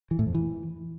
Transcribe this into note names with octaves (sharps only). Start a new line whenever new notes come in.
E3
A2
F2
E3